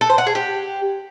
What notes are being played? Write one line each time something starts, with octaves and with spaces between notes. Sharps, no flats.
A4
C5
F#5
G#4
G4